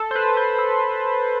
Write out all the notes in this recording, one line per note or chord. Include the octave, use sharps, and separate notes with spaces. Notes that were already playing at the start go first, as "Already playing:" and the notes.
Already playing: A4
C5
B4
C5
A4